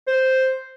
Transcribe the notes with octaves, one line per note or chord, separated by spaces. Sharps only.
C5